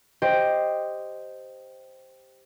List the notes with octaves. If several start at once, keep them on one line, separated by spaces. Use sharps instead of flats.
G4 C5 D#5 G5